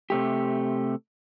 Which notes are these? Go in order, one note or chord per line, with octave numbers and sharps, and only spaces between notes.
C3 A3 G4